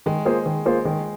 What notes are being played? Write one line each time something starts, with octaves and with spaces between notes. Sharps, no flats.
D#3 G#3
A#3 F4 G#4 C5
D#3
A#3 F4 G#4 C5
D#3 G#3